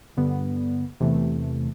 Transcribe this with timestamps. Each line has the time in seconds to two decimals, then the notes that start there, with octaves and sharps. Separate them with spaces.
0.17 G2 D3 G3 B3
1.00 E2 C3 E3 A3